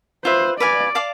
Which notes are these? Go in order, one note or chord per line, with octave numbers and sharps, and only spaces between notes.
F4 B4 C5 E5
B4 D5 F5 G#5
D5 F5 A5 D6